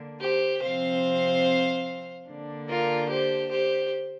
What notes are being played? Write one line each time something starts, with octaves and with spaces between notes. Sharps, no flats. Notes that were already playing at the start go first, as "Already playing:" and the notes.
Already playing: D3 A#3 D4
G4 C5
C3 F3 C4 C5 F5
D3 A#3 D4
F4 A#4
G4 C5
G4 C5